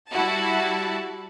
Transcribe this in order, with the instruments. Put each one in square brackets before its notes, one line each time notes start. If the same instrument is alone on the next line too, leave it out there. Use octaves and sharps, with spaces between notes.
[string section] G3 E4 F#4 A5